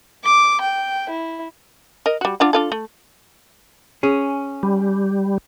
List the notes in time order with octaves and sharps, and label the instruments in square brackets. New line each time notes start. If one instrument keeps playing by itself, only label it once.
[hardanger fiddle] D6
G5
E4
[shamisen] A#4 D#5
G3 F#4
D4 F4 F#5
D4 F4 A4
A3
[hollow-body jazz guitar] C#4 G#4
[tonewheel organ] G3